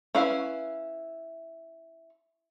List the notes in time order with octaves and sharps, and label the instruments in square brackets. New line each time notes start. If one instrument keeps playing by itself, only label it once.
[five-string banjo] C#4 E4 B4 F5